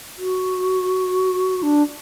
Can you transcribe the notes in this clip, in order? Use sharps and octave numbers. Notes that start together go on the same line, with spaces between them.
F#4
D4